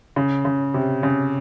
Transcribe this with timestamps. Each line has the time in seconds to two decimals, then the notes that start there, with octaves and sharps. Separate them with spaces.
0.16 C#3
0.45 C#3
0.74 C3
1.03 C#3